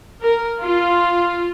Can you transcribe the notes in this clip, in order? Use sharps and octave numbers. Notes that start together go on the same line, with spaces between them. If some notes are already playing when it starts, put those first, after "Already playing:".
A#4
F4